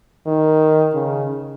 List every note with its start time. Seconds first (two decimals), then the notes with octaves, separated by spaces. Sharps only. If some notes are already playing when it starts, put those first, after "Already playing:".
0.27 D#3
0.94 C#3